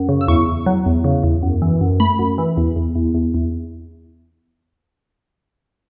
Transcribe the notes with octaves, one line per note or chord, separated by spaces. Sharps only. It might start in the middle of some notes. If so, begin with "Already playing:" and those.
Already playing: F#2
C#3
E6
E2 C#6
E2
F#3
E2
C#3
E2
F#2
E3
F#2
A3 B5
F#2
E3
E2
E2
E2
E2
E2